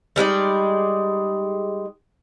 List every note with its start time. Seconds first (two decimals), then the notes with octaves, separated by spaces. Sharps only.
0.16 G3 G#3 D#4 D5